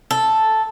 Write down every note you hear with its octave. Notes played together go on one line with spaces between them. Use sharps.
A4